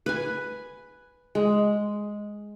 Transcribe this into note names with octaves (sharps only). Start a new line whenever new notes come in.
B4 G#5
G#3